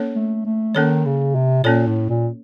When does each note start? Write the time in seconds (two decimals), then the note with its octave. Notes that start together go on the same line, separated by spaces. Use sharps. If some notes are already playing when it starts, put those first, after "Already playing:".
Already playing: A#3 C#4 A4 C#5
0.15 A3
0.45 A3
0.75 D#3 A#3 C#4 A4 C#5
1.05 C#3
1.35 C3
1.64 A#2 A#3 C#4 A4 C#5
1.87 A2
2.09 A#2